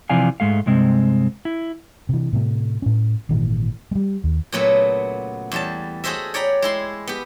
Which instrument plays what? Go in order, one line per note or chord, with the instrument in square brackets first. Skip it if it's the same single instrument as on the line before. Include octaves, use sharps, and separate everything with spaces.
[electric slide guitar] C3 E3 F3 D5 F5 G#5
G#2 G#3 A3 F5
G2 C3 G#3 C4
E4
[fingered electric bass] C3 E3
A2 C3 A3
A2 C#4
G#1 A#2 D#3 E3
G3 G#3
D#2
[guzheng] A#2 C#3 F#3 A3 B3
E2 G3 A5
F#4 G#4 A4 C5 D#5 E5
C#5 D5 G5 A#5 B5
G#3 E4 C6
B3 G4